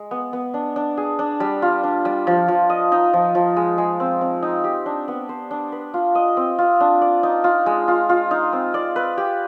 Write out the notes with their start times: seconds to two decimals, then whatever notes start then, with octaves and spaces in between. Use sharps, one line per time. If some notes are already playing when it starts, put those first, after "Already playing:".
Already playing: G#3
0.11 B3
0.33 B3
0.54 D4
0.76 D4
0.97 G#4
1.19 D4
1.40 G3
1.62 F4
1.83 D4
2.05 G3
2.27 F3
2.48 F3
2.70 D#5
2.92 D#4
3.13 F3
3.35 F3
3.56 G#3
3.78 G#3
4.00 C4
4.21 C4
4.43 D#4
4.64 G4
4.86 D4
5.08 B3
5.29 C5
5.51 D4
5.72 B4
5.94 F4
6.15 D#5
6.37 C4
6.59 F4
6.80 D4
7.02 D5
7.23 D#4
7.44 F4
7.66 G#3
7.88 F4
8.09 F4
8.31 D#4
8.53 C4
8.74 D5
8.96 B4
9.18 G4